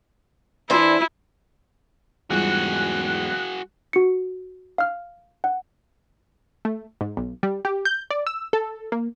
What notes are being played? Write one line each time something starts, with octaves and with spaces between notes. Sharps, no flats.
E3 D4 E4 C5
E2 G#2 G3 F4 F#4 G#4 F#6
F#4 C#7
F5 F6
F#5
A3
G#2
B1
G3
G4
G6
D5
E6
A4
A#3